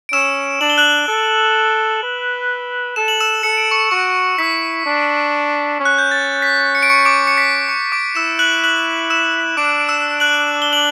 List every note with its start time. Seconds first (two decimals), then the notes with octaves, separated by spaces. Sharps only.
0.09 D7
0.13 C#4 E6 E7
0.61 D4 F#7
0.70 G7
0.78 F#6 F#7
1.08 A4
2.03 B4
2.96 A4 E7
3.08 F#7
3.20 E6 E7
3.43 A4 C#7
3.57 D7
3.71 C#6 C#7
3.91 F#4 C#6 C#7
4.38 E4 B6
4.86 D4
5.80 C#4
5.85 F#6
5.99 G6
6.11 A6
6.42 B6
6.75 C#7
6.83 D7
6.90 C#6 C#7
7.05 D6 D7
7.27 C#7
7.38 B6
7.68 C#6 C#7
7.92 D6 D7
8.15 E4 E6 E7
8.39 F#6 F#7
8.64 F#6 F#7
9.10 E6 E7
9.57 D4 D6 D7
9.80 D7
9.89 E6 E7
10.20 F#6 F#7
10.62 G7
10.73 F#7